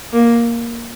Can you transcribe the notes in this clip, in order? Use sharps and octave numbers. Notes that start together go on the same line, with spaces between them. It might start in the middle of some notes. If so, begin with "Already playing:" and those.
A#3